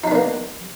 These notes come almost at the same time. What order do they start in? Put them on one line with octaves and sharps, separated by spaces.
D#4 D4 B3 A#3